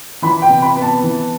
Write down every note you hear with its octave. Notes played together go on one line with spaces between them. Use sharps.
E3 B5
G5
C3
B5
B3
A5
E3